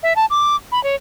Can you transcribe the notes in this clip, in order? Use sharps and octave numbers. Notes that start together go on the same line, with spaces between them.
E5
A5
D6
B5
C#5